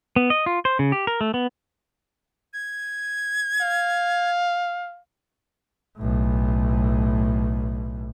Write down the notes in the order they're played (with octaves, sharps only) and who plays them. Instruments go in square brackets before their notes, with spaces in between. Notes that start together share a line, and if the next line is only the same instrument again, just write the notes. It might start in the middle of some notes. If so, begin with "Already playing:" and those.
[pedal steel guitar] B3
D#5
F4
C5
C#3
G4
A#4
A3
B3
[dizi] G#6
[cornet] F5
[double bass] B1 A2